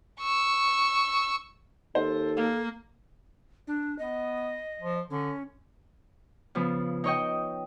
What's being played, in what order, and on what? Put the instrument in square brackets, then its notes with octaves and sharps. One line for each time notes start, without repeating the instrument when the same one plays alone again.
[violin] C#6 E6
[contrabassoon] D#2 [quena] A4 [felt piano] C5
[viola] A#3 [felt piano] F5
[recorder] D4
[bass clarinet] B3 [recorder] D#5
[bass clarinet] F3
[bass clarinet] D3 [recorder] C#4
[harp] C#3 F3 B3
D#4 C#5 D#5 G5